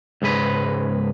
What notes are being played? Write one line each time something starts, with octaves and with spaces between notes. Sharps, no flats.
C#2 G#2 G#3 B4